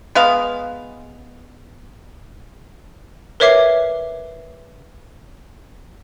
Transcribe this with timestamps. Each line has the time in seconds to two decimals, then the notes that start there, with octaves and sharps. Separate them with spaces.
0.15 G#3 B3 F5
3.40 A#4 B4 C#5 E5 D6 C7